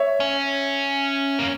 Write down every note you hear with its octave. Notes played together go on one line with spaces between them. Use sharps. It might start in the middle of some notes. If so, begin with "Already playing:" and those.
Already playing: C#5 E5
C#4
A#3